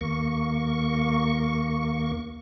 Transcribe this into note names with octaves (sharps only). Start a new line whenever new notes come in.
D#2 A#3 C#6